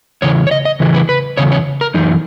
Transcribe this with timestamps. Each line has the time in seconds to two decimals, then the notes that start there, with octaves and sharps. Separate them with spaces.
0.22 E2 C#3 C#5
0.47 C#5
0.51 D#5
0.65 D#5
0.80 E2 C#3 E3
0.94 B4
1.09 B4
1.37 E2 C#3 C#5
1.52 C#5
1.81 A#4
1.94 F#2 E3 D#4